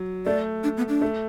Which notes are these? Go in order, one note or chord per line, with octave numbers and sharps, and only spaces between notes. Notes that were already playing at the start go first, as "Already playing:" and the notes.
Already playing: F#3
A3 D5
D4
B3
D4
A3